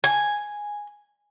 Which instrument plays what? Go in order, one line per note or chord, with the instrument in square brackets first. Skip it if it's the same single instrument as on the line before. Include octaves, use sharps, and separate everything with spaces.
[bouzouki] G#5